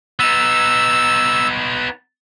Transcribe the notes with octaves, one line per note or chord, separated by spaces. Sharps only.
B3 D#4 E6